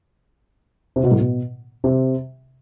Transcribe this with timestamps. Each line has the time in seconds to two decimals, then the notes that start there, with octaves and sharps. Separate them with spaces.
0.96 C3
1.03 B2
1.11 A2
1.19 B2
1.84 C3